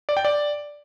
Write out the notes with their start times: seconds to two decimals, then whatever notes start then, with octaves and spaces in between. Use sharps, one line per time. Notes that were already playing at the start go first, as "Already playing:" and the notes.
0.09 D5
0.17 G5
0.25 D5